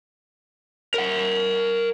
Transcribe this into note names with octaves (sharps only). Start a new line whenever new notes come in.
A#4 F#5